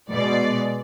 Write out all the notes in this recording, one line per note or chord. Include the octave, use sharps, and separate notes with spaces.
B2 G#3 D5